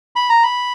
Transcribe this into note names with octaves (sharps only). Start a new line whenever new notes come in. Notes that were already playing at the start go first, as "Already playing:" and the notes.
B5
A#5
B5